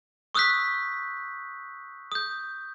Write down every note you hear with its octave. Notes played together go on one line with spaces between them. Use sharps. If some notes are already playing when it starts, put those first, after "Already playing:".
C#6 D#6 E6 F#6 G6 B6
D#6 G6